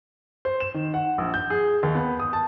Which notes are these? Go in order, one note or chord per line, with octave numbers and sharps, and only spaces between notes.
C5
E7
D#3
F#5
A#1
G6
G#4
D#2
B3
D#6
A5